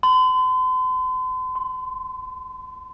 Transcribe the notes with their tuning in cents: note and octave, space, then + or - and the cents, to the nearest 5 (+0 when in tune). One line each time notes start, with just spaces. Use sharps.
C6 -45
C6 -5